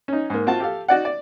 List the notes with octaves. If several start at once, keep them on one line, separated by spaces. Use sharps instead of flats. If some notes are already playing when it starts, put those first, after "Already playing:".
C#4 D#4
G#2 A#3
C4 F4 F#4 A5
G4 A4 F5
D#4 F#4 D5 F#5
D5